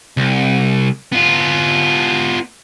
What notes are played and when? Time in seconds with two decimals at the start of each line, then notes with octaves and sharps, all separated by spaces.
0.17 C2
1.12 B3 F4